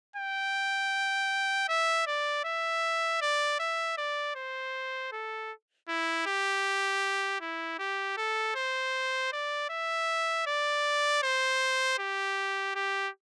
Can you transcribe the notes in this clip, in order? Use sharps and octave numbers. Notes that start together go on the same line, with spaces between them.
G5
E5
D5
E5
D5
E5
D5
C5
A4
E4
G4
E4
G4
A4
C5
D5
E5
D5
C5
G4
G4